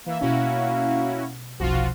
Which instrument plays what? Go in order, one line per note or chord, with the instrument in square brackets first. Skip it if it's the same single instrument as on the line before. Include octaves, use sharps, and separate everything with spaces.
[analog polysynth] E3 E5 [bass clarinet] A#3
[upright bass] B2 [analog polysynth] C#4 E4 F#4
[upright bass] F1 B1 [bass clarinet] F3 [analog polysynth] F4 F#4